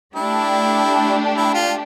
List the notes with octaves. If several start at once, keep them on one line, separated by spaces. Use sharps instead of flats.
A3 D4 E4 G4
E4
F4